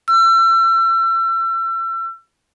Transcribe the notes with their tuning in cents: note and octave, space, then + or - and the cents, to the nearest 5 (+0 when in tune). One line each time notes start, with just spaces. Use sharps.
E6 +35